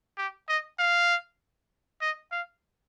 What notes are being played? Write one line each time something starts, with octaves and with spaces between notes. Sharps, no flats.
G4
D#5
F5
D#5
F5